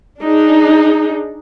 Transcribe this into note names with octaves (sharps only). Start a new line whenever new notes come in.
D4 D#4 G#4